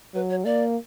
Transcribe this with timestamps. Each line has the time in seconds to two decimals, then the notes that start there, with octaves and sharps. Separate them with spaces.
0.14 F#3 B4
0.30 C#5
0.45 A#3 D5